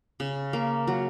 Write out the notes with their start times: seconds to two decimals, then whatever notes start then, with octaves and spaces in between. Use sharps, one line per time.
0.20 C#3
0.53 A#3
0.87 F#3